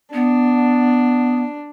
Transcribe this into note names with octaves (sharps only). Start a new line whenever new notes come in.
B3 D4